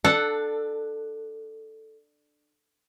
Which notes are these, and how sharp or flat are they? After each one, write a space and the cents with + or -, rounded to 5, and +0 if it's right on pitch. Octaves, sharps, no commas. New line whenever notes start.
D4 +20 A4 +0 F#5 +0